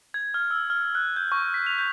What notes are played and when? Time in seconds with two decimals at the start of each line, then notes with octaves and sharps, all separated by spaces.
0.14 G#6
0.34 F6
0.51 E6
0.70 F6
0.95 F#6
1.16 G6
1.32 C#6
1.54 B6
1.66 F7
1.78 G6